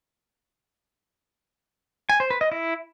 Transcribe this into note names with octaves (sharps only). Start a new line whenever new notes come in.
G#5
C5
B4
D#5
E4